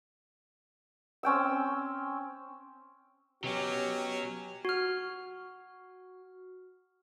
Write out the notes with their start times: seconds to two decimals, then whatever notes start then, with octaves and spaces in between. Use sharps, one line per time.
1.23 C4 C#4 G5 E6
3.44 B2 F#3 C#4 G4
4.65 F#4 F6